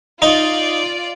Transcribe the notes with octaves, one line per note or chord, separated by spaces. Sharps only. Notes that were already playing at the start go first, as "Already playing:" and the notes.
D#4 F4 D5